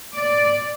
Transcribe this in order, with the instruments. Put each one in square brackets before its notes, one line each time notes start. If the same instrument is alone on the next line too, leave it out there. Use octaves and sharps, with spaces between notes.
[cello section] D5